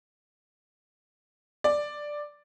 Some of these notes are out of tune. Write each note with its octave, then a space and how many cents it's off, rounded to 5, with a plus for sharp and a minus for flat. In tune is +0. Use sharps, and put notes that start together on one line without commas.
D5 +5